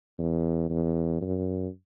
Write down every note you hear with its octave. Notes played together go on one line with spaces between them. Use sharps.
E2
E2
F#2